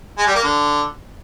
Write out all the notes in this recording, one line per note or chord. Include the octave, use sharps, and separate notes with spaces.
G#3
G3
A#3
D3